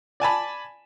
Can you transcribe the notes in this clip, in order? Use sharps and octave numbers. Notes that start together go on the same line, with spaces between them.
D5 G#5 A5 B5